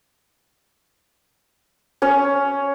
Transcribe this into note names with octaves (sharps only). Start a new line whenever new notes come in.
C#4 C#5